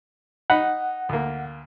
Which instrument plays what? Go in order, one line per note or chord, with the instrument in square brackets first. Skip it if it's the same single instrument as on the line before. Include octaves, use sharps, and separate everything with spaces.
[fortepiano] D#4 B5 [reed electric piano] F#5
[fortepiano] D2 A#3